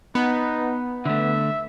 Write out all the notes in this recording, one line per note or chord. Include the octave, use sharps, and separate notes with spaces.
B3 D#4
D3 A3 E5